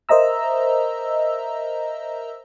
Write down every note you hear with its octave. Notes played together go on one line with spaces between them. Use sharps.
A#4 C5 D#5 E5 A#5 E6